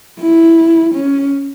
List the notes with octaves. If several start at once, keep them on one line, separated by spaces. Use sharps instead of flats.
E4
C#4